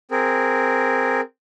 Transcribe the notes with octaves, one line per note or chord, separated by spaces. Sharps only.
C4 G#4 A#4